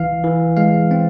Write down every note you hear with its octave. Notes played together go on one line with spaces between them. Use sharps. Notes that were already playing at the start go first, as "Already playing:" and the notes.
Already playing: E3 F5
E3
G#3 F5
C4